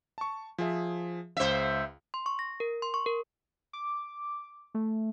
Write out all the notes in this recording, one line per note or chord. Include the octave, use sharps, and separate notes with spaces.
A5 C#6
F3 G#4 E5
C#2 C5 E5 F5
C6
C#6
A#6
A#4
C6
C#6
A#4
D6
A3